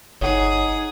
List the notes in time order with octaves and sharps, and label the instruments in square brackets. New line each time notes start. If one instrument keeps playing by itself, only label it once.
[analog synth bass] G1 [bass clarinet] D#4 [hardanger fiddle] G#4 [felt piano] C#5 F#5